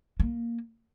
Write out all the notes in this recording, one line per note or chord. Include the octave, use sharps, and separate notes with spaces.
A#3